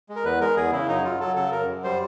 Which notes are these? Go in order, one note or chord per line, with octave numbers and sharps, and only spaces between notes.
G#3
A#4
E2 B4
G#3 A#4
E2 G#4
C#3 E4
F#2 D#4
F#3 F4
F#3 A4
C#3 A4
F#2 A#4
F#2
G3 C5